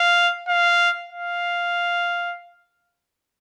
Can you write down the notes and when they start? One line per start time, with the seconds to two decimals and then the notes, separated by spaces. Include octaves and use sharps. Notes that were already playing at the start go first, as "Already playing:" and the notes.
Already playing: F5
0.48 F5
1.09 F5